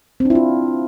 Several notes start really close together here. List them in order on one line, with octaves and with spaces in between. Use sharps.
C4 D4 E4 F4